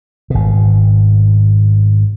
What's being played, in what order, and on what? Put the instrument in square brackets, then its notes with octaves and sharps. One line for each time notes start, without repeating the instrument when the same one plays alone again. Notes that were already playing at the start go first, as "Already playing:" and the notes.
[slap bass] G#1 B2